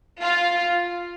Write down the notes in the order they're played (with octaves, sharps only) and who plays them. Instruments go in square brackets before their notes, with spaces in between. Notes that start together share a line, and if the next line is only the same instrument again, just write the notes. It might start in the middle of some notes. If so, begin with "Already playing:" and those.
[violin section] F4